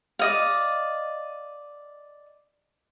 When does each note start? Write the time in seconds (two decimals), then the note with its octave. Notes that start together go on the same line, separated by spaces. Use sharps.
0.19 D5 D#5 F5